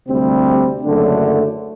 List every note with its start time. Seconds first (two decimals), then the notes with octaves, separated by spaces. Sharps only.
0.09 D2 C3 G3 C4
0.83 F#1 F#2 D3 A3 D4